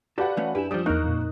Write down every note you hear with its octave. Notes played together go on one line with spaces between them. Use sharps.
F#4 G4 A4 B4 D5 F5 F#5 A5
E3 A3 C#4
F#2 D4 E4 G4 B4 G#5 E7
F3 G3 D5 D#6
E2 A#3 D#4 A#4 C#6 F6 F#6 D7
F2 A#2